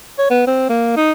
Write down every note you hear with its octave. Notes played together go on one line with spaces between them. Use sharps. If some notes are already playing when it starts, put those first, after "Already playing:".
C#5
B3
C4
A#3
D#4